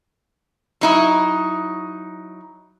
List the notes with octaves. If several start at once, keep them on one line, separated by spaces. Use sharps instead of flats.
F#3 D#4 E4